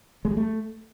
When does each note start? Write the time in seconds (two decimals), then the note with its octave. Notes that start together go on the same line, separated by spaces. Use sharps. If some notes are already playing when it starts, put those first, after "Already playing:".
0.25 G#3
0.31 G3
0.37 A3